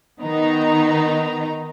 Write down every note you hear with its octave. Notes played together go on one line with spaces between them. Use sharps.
D#3 B3 D#4 A#5